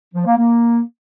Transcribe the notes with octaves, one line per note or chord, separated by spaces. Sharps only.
F3
A#3
A#3